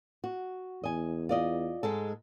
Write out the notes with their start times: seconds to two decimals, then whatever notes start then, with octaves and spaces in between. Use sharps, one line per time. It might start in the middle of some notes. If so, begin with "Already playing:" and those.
0.24 F#4
0.84 E2 D#5 G#5
1.29 F4 D5 D#5
1.83 G#2 G#3 A4